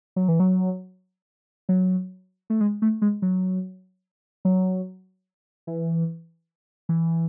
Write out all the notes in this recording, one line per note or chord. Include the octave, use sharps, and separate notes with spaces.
F#3
E3
F#3
F#3
A3
G#3
A3
G#3
F#3
F#3
E3
E3